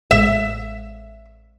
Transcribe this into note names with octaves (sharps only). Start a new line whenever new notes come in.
A1 A2 G#3 E5